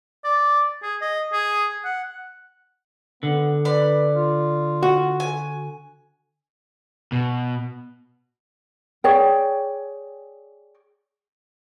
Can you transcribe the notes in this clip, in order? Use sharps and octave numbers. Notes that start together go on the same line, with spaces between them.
D5
G#4
D#5
G#4
F#5
D3 B3
B4 D5 B5
F4
F#4
G#5
B2
G#4 C#5 D5 G5